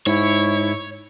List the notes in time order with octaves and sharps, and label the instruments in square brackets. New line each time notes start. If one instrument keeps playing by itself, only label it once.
[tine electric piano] G#2 [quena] E4 [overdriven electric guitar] C#5